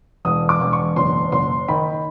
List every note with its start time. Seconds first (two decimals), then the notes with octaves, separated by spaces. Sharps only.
0.25 E1 D#6
0.49 D6
0.61 E1
0.73 C#6
0.96 F#1 C6
1.32 F#1 C6
1.68 D#3 B5